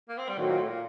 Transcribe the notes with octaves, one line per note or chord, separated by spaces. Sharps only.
A#3
C4
G3
A2 D#3 F#3 C4 F#4
A#2
A2
A#2